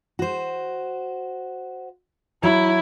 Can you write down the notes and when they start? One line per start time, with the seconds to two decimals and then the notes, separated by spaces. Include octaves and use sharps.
0.19 F#4 C5
2.43 F#3 E4